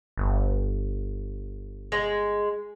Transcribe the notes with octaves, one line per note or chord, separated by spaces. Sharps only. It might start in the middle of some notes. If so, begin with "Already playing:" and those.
G1
G#3